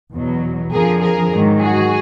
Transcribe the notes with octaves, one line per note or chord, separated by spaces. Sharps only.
E2 B2 F#3
F2 D3 F3 G#4 A#4
G#4 A#4
G#2 D#3 F#3
F#4 G#4